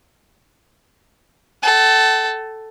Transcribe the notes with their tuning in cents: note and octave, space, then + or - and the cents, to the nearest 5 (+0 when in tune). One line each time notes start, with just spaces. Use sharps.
A4 +0 F#5 +45